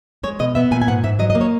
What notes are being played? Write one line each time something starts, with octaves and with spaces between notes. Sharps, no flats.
G#3 C#5
B2 D#5
B3 E5
A#2 G#5
G#5
G#2 F#5
G#2 E5
F#3 D#5
D#5
A#3
C#5